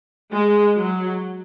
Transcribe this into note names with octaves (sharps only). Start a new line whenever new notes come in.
G#3
F#3